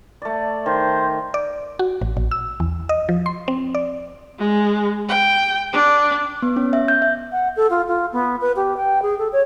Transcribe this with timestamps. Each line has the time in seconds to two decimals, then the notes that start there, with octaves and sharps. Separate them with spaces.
0.22 A3 D5
0.66 D#3 C5
1.34 D5
1.79 F#4
2.01 A1
2.17 A#1
2.31 E6
2.60 E2
2.89 D#5
3.09 F3
3.26 C6
3.48 C4
3.75 D5
4.38 G#3
5.08 G5
5.73 D4
6.42 B3
6.56 C#4
6.73 E5
6.88 G6
7.02 E5
7.32 F#5
7.56 A4
7.70 F4
7.88 F4
8.13 B3
8.41 B4
8.56 G4
8.77 G5
9.02 G#4
9.19 A4
9.33 C#5